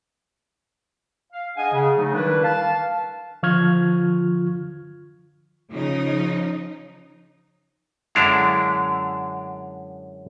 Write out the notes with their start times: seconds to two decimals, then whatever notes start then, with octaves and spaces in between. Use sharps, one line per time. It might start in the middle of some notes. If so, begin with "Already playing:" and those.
1.32 F5
1.56 D4 G#4 D#5 F#5 G#5
1.73 C#3
1.97 C#3 F#3 A3 D#4
2.13 D#3 E3 G3 D4 E4 B4
2.43 F5 A5
3.43 D3 F3 F4 C#6 F6 G#6
5.69 C#3 F3 D#4
8.15 F#2 D3 G#3 D4 E4 F5